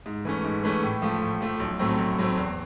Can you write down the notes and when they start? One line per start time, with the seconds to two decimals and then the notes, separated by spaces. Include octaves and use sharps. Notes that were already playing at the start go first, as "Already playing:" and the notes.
0.06 G#2
0.25 E3 A3 C#4
0.44 G#2
0.64 E3 A3 C#4
0.83 A2
1.02 F3 A3
1.22 A2
1.41 F3 A3
1.60 B1
1.79 A2 F#3 A3 C4
1.98 B1
2.18 A2 F#3 A3 C4
2.38 E2